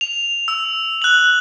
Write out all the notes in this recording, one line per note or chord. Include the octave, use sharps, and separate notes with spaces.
F7
E6
F#6 F#7